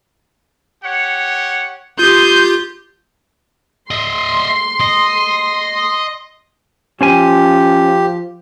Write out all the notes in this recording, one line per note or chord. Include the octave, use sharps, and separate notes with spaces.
G4 C#5 F#5
F4 G4 C6 D#6 G6
D#5 E5 C6
D#5
F3 C#4 G4 C5 G#5